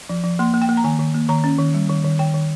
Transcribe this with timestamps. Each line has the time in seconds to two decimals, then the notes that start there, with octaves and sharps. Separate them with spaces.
0.09 F3
0.24 F3
0.39 A#3 C6
0.54 A#3
0.62 G5
0.69 A#3
0.77 A#5
0.84 D#3 G#5
0.99 D#3
1.14 A#3
1.29 D#3 A#5
1.44 C#4
1.59 D#3
1.74 G3
1.89 D#3
2.04 D#3
2.19 D#3 G5
2.34 D#3